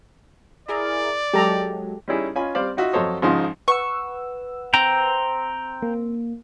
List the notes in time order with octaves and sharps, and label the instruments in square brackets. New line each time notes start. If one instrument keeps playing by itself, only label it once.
[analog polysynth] E4 G#4 A#4 [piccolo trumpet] D5
[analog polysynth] F#3 G#3 [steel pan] G4 A4 A#5
[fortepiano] G3 C#4 D#4 E4 G#4
C#4 F4 D#5 G#5 B5
G3 C4 C5 D5 F5
D#4 F4 F#4 D#5 E5
F2 F#3 A4 C5 C#5 D#5
G#1 C#3 F3 G#3 D#4 C6
[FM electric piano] B4 F#5 E6 [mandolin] C#6
[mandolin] C4 [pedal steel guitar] G5 A#5
[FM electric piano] A#3